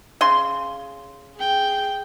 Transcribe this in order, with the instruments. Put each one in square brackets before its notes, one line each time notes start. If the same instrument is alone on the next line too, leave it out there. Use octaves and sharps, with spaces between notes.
[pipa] C#3 C6
[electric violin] G#4 G5